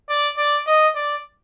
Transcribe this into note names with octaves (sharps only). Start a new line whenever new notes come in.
D5
D5
D#5
D5